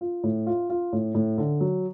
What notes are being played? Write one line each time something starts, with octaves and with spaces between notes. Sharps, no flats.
F4
A2
F4
F4
A2
A2
D3
F#3